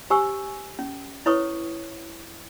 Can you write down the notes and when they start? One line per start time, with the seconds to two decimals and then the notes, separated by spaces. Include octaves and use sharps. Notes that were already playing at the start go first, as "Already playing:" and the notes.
0.10 G4 C5 G#5 C#6 E6
0.79 C#4
1.26 E4 B4 C#5 C#6 D#6